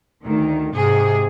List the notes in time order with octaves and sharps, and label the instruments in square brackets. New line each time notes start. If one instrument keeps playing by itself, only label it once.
[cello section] D2 D#3
G#2 C3 G#4